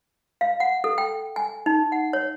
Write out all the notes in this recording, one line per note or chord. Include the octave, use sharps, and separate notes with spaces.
F5
F#5
A4
G5
G#5
D#4
F#5
C#5